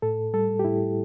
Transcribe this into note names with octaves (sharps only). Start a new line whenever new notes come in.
A2 A4
G3 A4
G4
A2 E4